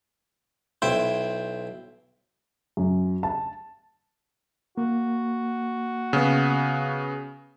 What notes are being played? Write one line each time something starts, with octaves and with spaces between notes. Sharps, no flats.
B1 E4 C5 G5
F#2
A5
A#3 F#4
C#3 B3